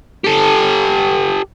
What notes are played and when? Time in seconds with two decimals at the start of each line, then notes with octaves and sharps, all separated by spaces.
0.24 G4 A4